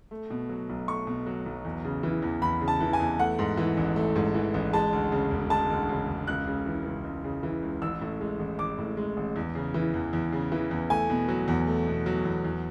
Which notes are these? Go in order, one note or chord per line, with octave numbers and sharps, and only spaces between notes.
A3
B2
F#3
B1
A3 C#6
B2
F#3
B1
E2
C#3
E3
E2
E2 B5
C#3
A5
E3
G#5
E2
A3 F#5
G#2
E3
A1
A3
G#2
E3
A1
G#3 A5
D2
C#3
E1
G#3 A5
D2
C#3
E1
C#2 F#6
C#3
E3
C#2
C#2
C#3
E3
C#2
A1 E6
A2
G#3
A1
A1 D6
A2
G#3
A1
E2
C#3
E3
E2
E2
C#3
E3
E2
A3 G#5
B2
F#3
E2
A3
B2
F#3
E2
E2